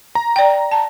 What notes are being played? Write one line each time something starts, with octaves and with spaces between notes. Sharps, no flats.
A#5
D5 G5
A5